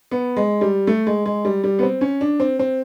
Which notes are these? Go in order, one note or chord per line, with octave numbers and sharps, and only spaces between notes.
B3
G#3
G3
A3
G#3
G#3
G3
G3
B3
C4
C#4
D4
C4
C4